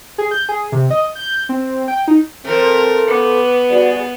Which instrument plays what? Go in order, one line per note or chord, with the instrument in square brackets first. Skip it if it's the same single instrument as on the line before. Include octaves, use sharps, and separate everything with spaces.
[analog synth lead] G#4
G6
G#4
C3
D#5
G6
C4
G5
D#4
[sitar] F3 A3 [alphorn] C4 [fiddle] A#4
[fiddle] B3 [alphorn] B4 [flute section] D6
[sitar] G2 [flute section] F#4 G#4 D5